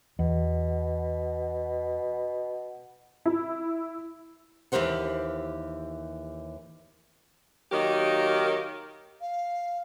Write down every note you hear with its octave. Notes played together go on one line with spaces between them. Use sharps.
E2 B2
E4
D#2 E3 G4 A#4 C5 F#5
D#3 F#3 A#3 G4 D#5
F5